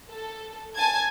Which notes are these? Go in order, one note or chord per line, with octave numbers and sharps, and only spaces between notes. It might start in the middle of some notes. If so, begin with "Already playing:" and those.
A4
G#5 A5 G#6